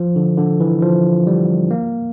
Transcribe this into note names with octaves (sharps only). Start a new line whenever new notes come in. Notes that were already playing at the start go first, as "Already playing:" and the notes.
Already playing: F3
D3
D3
E3
F3
G3
A#3